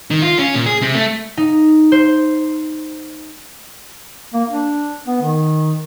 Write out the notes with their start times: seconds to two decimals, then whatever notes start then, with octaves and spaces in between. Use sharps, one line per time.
0.11 D#3
0.22 F4
0.38 C#4
0.55 A#2
0.66 G#4
0.82 C3
0.95 A3
1.37 D#4
1.92 C5
4.34 A#3
4.50 D4
5.07 B3
5.21 D#3